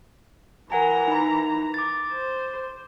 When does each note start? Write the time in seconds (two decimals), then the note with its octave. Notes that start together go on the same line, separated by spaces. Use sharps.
0.72 E3 A#4 F#5 G#5 A#5
1.08 D#4 B5
1.74 D6 A6
2.12 C5